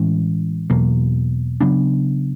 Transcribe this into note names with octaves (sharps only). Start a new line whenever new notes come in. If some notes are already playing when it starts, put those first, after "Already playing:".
Already playing: A2 E3 G#3 C#4
E2 B2 F#3 A#3
C#3 F#3 B3 D4